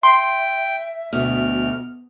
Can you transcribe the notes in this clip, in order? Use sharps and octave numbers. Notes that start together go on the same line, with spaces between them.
E5 G5 C6
D2 B2 F6